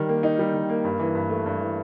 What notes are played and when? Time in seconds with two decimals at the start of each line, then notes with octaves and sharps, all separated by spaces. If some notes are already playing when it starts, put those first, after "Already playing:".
Already playing: D#3 G3 D#4
0.09 A#3
0.23 D#4
0.39 G3
0.54 D#3
0.69 A#3
0.84 G2
0.99 E3
1.15 G2
1.29 A3
1.46 G2
1.60 E3